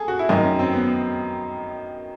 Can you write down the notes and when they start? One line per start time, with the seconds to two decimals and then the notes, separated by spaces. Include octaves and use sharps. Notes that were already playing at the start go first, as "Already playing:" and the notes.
Already playing: G#4 A4
0.08 F#4
0.19 E4
0.29 F#2 D#3 D#4
0.44 C#4
0.59 C4
0.73 B3